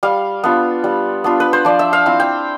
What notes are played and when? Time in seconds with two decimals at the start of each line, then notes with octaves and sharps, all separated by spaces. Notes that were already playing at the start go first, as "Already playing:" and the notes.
0.03 G3 F5
0.44 B3 D4 F4
0.84 G3
1.24 B3 D4 F4
1.40 B4
1.53 C5
1.65 F3 D5
1.79 E5
1.93 F5
2.06 C4 E4
2.20 G5